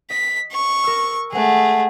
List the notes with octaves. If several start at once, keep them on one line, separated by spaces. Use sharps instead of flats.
D#5 B6
C#6
A#4 E6
G#3 A3 G#4 F#5